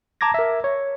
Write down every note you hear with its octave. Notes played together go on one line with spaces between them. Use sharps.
A5 A#5 D6 G#6 A#6
A#4 E5
C#5